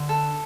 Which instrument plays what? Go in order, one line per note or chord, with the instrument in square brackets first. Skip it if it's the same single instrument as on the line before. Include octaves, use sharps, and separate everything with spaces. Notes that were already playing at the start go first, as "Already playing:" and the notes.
Already playing: [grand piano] D3
[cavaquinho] A4